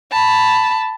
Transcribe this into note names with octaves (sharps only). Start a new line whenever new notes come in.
A5 B5